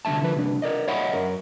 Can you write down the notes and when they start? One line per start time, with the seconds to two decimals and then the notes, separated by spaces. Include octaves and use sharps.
0.05 C2 D3 F3 E5 A5
0.21 D3 F3 B4
0.36 C2 D4
0.62 A#4 D5 D#5
0.88 C#5 D#5 E5 F#5 B5
1.14 F#2 A#4